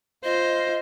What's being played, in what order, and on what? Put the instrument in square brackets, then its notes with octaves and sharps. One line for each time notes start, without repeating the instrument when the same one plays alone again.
[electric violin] F4 C5 [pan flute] D#5